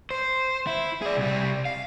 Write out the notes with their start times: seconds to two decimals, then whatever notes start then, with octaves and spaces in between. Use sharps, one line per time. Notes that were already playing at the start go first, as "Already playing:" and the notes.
0.11 C5
0.67 E4
1.02 G#4 D5
1.17 C2 G3
1.65 F5